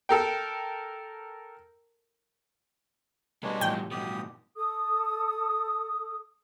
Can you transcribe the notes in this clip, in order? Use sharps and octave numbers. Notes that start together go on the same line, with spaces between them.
A4 A#4 G5
B2 G3 G#3 D4 A#4 B4 C#5
A2 E3 F3 G5
G2 B2 G4 D#6
A4 D#6